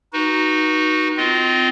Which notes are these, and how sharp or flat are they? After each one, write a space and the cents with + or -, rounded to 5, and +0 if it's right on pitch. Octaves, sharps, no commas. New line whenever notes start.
D#4 +0 F#4 +0 B4 -35
C4 -30 F4 +0 D#5 +0